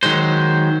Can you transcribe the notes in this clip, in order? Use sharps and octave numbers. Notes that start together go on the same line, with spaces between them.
D#3 F#3 G#3 C5